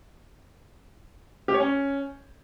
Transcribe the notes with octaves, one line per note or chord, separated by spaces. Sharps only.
G4
C#5
C#4